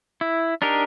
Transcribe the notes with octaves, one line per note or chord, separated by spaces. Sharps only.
E4
D4 D#4 G4 A#4